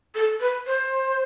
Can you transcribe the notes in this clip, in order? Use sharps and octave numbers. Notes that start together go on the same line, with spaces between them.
A4
B4
C5